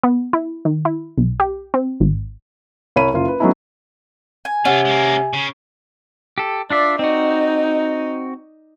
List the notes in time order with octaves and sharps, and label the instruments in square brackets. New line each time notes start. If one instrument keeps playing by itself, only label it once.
[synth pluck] B3
E4
D#3
E4
B1
G4
C4
G#1
[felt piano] C2 C#5 B5 D#7
F#1 F4
B4
F#3 A3 B3 C#4 D#4 E4
[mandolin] G#5
[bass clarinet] C3 [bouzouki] C#4 F#5 [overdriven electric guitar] F4 A4
[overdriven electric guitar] G#3 A#3
C#3
[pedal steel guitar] G4 A4
[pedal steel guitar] D4 F4 E5 [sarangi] D5
[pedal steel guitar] C4 F#4 [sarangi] D#4